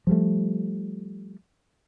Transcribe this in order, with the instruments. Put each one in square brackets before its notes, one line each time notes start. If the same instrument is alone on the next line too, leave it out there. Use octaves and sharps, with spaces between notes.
[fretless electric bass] F3 G3 A3